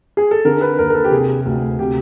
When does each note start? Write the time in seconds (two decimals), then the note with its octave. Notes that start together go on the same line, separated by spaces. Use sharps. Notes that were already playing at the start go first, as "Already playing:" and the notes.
0.17 G#4
0.31 A4
0.45 D3 A#4
0.61 B4
0.79 D#2 A#4
0.90 A#4
0.95 A4
1.05 G4
1.11 C3 G#4
1.46 D2
1.79 C3 G4